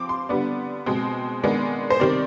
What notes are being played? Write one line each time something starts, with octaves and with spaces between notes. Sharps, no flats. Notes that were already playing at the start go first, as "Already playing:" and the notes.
Already playing: F3 C4 D6
C6
D3 G3 B3 D4
B2 G#3 C4
D#3 G#3 B3 D4
C5
C3 D#3 G3 C4 D5